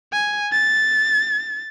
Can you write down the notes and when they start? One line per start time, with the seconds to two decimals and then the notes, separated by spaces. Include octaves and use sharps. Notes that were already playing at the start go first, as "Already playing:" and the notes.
0.12 G#5
0.52 A6